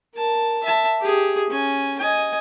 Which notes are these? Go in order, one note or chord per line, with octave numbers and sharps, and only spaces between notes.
A#4 A5
E5 A5
G4 G#4
C#4 G#5
D#5 G#5